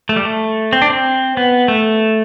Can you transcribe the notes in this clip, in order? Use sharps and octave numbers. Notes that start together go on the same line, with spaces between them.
A3
G3
A3
C4
D4
C4
B3
A3